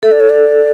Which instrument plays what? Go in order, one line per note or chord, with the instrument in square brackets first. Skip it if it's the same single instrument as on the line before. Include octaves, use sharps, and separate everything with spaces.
[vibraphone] A4 [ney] E5
[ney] D5
C#5
D5